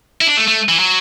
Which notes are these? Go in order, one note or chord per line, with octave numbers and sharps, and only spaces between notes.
E4
D4
A3
A3
E3
F#3